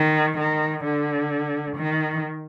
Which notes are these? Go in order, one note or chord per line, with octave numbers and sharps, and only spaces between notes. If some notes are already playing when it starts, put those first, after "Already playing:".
Already playing: D#3
D#3
D3
D#3